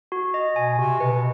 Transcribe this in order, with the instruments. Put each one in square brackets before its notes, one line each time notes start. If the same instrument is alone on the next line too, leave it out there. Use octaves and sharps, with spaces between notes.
[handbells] F#4
D#5
[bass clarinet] B2 [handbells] G#5
[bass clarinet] C3 [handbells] F#4
[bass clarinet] B2 [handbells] B4